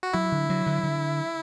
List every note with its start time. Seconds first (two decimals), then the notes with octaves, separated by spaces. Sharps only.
0.03 F#4
0.13 F#3 E4
0.32 D3
0.50 F#3
0.66 D3
0.83 D3